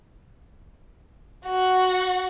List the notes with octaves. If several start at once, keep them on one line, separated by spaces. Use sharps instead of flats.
F#4 F#5